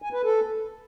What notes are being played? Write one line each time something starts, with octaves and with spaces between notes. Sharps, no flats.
G#5
B4
A4